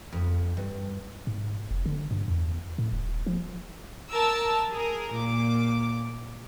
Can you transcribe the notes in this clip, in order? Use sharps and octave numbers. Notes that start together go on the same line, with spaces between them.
F2
G2
G#2
F1
D3
G2
E2
A2
D#1
F3
A#4 A5 E6
G#4 A#4
A#2 D6